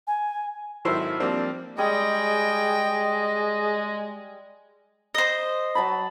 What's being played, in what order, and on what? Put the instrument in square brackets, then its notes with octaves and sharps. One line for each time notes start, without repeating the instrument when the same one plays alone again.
[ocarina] G#5
[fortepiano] G#1 D#3 F#3 E4 A4 C5
F3 G3 A#3 C4 D4
[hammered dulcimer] G3 G#4 [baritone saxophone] G#3 [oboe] D#5 [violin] G5
[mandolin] C5 D#5
[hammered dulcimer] F#3 A5 B5